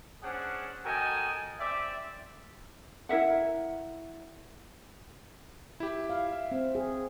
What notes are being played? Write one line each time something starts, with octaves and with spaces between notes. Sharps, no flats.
C#4 D4 G#4 C5 F#5
F#4 A4 A#4 D#5 G5 G#5
C4 G4 D5 E5
E4 A#4 E5 F#5
E4 G4
F5
E5
C4
G#4